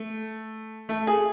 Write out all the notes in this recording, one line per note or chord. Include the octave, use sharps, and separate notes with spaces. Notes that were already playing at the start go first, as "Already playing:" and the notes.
Already playing: A3
A3
G#4